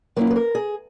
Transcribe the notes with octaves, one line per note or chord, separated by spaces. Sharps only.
F#3 A#3 C#4 E4 B4
B4
A#4
G#4